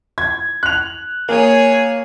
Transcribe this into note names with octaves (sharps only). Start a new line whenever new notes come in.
G#6
F#6 F7
A#3 G#4 C#5